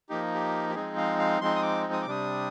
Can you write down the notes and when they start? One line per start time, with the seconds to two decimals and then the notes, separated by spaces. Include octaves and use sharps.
0.09 F3 A#3 D#4 G4
0.34 G4
0.70 G4
0.75 F3 G#3 C4 D#4 G#4
0.97 F5
1.19 F5
1.41 F3 G#3 C4 D#4 C6
1.56 D#6
1.62 D6
1.93 D#6
2.02 D6
2.06 C3 G3 D4 D#6